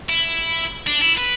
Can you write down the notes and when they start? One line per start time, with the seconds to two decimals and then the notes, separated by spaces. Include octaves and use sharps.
0.09 E4
0.87 D4
1.02 E4
1.18 B4